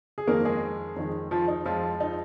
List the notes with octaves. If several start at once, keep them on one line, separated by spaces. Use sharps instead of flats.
G#4
F2 D#3 G#3 A#3 A#4
G#3 G#4
F2 D#3 G#3
F3 F4
D#4
F2 F3 G#3 F4
D#4